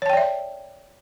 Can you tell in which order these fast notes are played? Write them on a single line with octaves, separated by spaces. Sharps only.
C#5 A5 G5 D5 E5